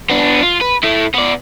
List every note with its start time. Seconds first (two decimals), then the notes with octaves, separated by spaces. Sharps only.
0.09 B3 D4
0.43 F4
0.61 B4
0.84 A3 E4
1.15 B3 D5